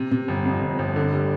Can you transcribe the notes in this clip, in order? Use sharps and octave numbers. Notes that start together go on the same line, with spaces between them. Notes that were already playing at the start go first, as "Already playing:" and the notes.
Already playing: C3
C3
G1
F2
G1
G1
D3
G3